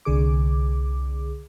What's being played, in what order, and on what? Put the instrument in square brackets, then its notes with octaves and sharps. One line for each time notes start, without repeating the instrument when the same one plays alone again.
[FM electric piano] C2 D3 G#4 D6